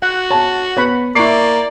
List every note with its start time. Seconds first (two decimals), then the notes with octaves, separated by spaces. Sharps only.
0.02 F#4 F#5
0.31 C#5 A5
0.77 B3 C#5 F#5 B5
1.15 A#3 E4 D5 C#6 D6 C7